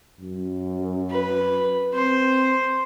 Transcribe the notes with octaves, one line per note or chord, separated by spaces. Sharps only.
F#2
B4
C4 C5